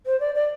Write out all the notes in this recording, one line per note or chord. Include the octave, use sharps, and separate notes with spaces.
C5
D5
D5